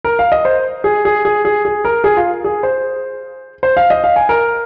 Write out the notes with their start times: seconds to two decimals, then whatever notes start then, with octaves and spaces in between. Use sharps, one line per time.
0.04 A#4
0.19 F5
0.32 D#5
0.45 C5
0.84 G#4
1.05 G#4
1.25 G#4
1.45 G#4
1.65 G#4
1.85 A#4
2.04 G#4
2.17 F4
2.45 G#4
2.63 C5
3.63 C5
3.77 F5
3.90 D#5
4.04 F5
4.16 G#5
4.29 A#4